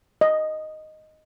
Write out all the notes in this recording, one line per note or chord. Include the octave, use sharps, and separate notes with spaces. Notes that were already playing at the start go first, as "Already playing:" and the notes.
D#5